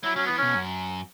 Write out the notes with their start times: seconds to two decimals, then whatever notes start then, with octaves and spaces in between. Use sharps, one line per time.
0.04 F#3 E4
0.16 F#3 C#4
0.26 E3 B3
0.38 B2 C#4
0.55 F#2